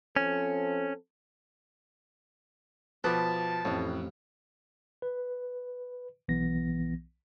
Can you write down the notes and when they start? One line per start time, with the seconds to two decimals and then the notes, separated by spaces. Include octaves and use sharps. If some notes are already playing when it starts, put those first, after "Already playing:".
0.16 F3 C4 C#4 A4
3.04 B2 F3 B4 G5 A5 D6 D#6
3.65 A1 F2 A2
5.02 B4
6.28 B1 E3 B3 A#6